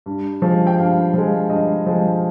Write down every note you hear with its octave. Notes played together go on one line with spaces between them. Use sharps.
G2
F3 G#3
G5
G2 F5
F3 G#3
G2 D#5
F3 G#3